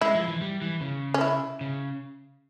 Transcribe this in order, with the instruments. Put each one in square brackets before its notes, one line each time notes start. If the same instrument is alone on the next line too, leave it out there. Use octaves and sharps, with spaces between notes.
[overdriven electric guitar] G#3 [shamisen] E4
[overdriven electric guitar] F3
E3
G3
E3
C#3
[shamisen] C#4
E4
[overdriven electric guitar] C#3